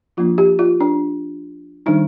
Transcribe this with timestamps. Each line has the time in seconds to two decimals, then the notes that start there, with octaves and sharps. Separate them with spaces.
0.17 F3 A#3 D4 F4
0.38 G4
0.59 F4
0.80 D4
1.86 D#3 G3 D4 D#4